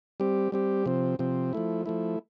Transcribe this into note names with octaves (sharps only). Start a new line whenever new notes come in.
G3 C4 G4
G3 C4 G4
C3 F3 C4
C3 F3 C4
F3 A3 E4
F3 A3 E4